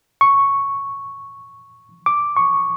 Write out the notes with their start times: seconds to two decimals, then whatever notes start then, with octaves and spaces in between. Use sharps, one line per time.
0.21 C#6
2.06 D6
2.37 C#6